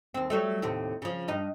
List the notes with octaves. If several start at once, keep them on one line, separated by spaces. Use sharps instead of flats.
D#2 C4
F#3 G3 A3
D#2 A2 C3
C#3 F3
G2 D#4